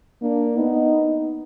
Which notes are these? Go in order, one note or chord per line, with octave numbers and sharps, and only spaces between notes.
A#3 D4
B3 D#4